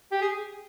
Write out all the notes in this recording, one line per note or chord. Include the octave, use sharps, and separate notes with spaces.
G4
G#4